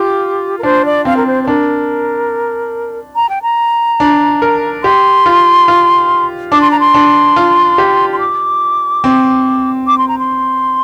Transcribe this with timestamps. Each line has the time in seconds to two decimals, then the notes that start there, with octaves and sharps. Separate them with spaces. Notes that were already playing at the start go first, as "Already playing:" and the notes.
Already playing: F4 G4
0.59 A#4
0.63 D4 C5
0.85 D5
1.05 C4 F5
1.17 A#4
1.27 C5
1.44 C5
1.47 D4 A#4
3.16 A#5
3.29 G5
3.42 A#5
4.00 D4
4.42 A#4
4.84 G4 C6
5.26 F4
5.68 F4
6.52 D4 D6
6.61 C6
6.71 A#5
6.80 C6
6.94 D4
7.36 F4
7.78 G4
8.13 C6
8.19 D6
9.04 C4
9.87 D6
9.98 C6
10.08 A#5
10.19 C6